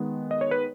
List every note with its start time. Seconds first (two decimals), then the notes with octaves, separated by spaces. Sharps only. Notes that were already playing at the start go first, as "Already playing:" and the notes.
Already playing: D#3 G#3 B3
0.31 D#5
0.41 C#5
0.51 B4